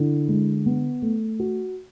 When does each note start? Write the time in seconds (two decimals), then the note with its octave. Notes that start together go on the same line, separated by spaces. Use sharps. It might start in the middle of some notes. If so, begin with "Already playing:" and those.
Already playing: D3 E4
0.28 G#3
0.66 B3
1.02 A3
1.40 F#4